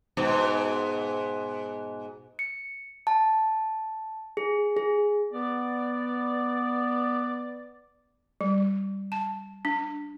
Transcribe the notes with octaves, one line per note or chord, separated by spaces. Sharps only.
G#2 B2
C#7
A5
G#4
G#4
B3 D5
G3
A5
D4